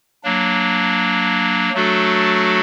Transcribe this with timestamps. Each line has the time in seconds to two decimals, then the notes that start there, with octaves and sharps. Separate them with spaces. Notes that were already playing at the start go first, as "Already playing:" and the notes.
0.24 F#3 A#3 D4
1.73 F#3 A3 D4 F#4 A4